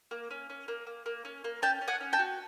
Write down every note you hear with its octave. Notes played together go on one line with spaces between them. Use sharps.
A#3
C#4
C#4
A#3
A#3
A#3
C#4
A#3
C#4 G5 A5
C#4
F#5 G#5
C#4
G5 A5
F#4